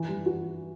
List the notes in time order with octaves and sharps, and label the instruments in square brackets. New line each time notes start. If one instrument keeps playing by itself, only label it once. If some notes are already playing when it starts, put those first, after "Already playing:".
Already playing: [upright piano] E3
G3
F#4